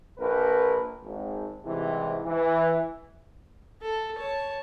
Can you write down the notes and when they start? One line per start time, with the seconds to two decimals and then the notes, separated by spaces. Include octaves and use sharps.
0.18 A#1 A#4 B4
1.03 G#1
1.64 C2 G#2 C3 E3
2.26 E3
3.82 A4
4.16 C#5 A5